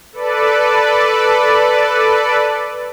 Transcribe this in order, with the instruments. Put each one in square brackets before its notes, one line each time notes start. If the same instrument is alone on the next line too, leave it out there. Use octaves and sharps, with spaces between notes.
[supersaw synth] A4 B4 D5